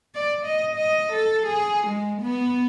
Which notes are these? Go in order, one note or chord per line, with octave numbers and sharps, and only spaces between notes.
D5
D#5
D#5
A4
G#4
G#3
B3